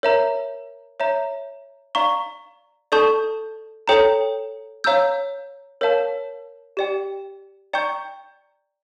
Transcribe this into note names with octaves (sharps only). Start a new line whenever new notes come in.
A#4 C#5 E5 A#5
C#5 E5 A#5
D5 F5 A#5 C#6
A4 D5 A5 C#6 G6
A4 C#5 G5 A#5
C#5 F5 A#5 E6 G6
A#4 C#5 F5 A5
G4 D5 G5
D5 G5 A#5 C#6 G6